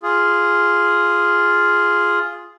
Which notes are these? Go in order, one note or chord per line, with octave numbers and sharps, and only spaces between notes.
F4 G#4